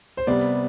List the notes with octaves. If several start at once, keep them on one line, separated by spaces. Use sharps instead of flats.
C5
C3 G3 B3 D5